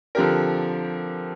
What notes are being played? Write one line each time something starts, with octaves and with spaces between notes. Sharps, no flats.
D3 F3 C4 G4 A#4